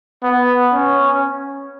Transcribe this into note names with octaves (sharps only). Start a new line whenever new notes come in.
B3
C#4